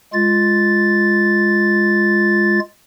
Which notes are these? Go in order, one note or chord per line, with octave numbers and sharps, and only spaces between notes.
G#3 F4 A6